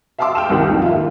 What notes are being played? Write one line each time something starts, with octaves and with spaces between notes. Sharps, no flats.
E5 F5 A5 C6 D6 E6
G5 F6 E7
C2 C3 D#3 F#5
B1 F2 A#2
F4 E5
D#3